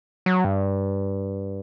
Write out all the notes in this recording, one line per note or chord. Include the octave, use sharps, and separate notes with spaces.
F#3
G2